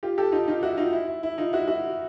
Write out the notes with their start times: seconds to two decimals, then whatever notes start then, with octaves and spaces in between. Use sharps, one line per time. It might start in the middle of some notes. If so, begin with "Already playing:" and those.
0.03 F4 G4
0.18 G4 A4
0.32 D#4 F4
0.48 D#4 F4
0.63 E4 F#4
0.77 D#4 F4
0.93 E4
1.08 E4
1.23 E4
1.38 D#4 F4
1.53 E4 F#4
1.68 E4 F#4